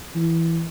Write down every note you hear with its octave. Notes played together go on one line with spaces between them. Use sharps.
E3